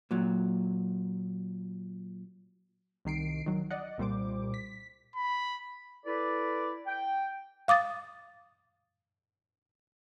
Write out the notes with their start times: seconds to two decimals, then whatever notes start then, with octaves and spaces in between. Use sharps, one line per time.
0.11 A#2 F#3
3.05 C2 D#3 C7 D7
3.46 D#3 F#3
3.71 D5 D#5 F#5
3.98 C2 A#2 G3 C5 D6
4.54 B6
5.16 B5
6.06 E4 A4 B4 D5
6.87 G5
7.68 F5 D6 D#6 A6